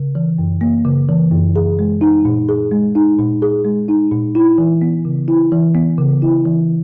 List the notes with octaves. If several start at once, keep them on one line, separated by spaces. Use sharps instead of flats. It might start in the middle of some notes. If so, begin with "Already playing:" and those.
Already playing: C#3
E3
F#2
A#3
C#3
E3
F#2
G#4
G#3
D#4
A#2
G#4
G#3
D#4
A#2
G#4
G#3
D#4
A#2
E4
E3
B3
C#3
E4
E3
B3
C#3
E4
E3